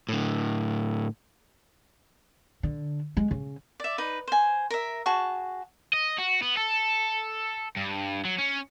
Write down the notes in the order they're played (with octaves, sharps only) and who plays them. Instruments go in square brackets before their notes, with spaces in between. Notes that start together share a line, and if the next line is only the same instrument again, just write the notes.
[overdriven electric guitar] A2 D3
[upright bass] D3
G#3
C#3
[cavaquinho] D5 E5
D#4 B4
C5 G#5
A#4 E5
F#4 G#4 A5 C#6
[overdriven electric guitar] D#5
F#4
B3
A4
G2
F#3
C#4